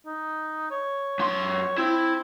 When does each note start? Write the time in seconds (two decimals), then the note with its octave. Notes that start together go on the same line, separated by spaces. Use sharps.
0.06 D#4
0.71 C#5
1.19 F#2 C6
1.78 C4 E4